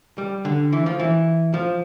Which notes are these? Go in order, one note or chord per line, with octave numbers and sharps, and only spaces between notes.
G3
D3
E3
F3
E3
F3